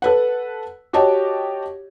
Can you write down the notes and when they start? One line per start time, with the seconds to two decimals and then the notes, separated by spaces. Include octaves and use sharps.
0.02 A4 B4 F#5
0.93 F#4 G4 C#5 D#5 A5